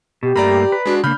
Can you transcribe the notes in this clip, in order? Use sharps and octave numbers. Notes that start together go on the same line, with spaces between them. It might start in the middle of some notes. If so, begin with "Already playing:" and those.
B2 G4
G2 A3 A#3 D5 A#5 B5
B4
G#3 D4 F#4
C#3 A#3 D4 B5 F6 G6